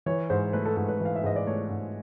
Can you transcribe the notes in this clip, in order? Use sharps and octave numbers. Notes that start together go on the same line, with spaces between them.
E3 C#5
G#2 C5
A3 B4
A4
G#2 A4
B4
E3
F5
E5
G#2 D#5
D5
A3 C#5
G#2